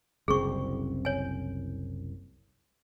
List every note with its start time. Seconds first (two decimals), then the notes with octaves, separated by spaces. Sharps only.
0.28 F#1 C2 C4 G#4 C#6
1.05 C#5 G#5